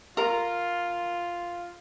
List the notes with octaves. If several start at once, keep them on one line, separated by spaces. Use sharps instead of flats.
F4 A#4